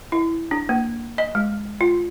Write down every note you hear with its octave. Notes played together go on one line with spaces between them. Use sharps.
E4
D4
A#3
D#5
G#3
F4